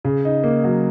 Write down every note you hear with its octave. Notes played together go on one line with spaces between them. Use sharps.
C#3
D#4
A#3
F#3